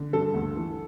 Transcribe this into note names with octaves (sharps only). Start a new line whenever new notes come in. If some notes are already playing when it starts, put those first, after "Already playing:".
Already playing: D3
G2 A4
D2
E3